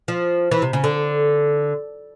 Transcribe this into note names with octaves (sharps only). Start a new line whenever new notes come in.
F3
E3
C3
C#3
D3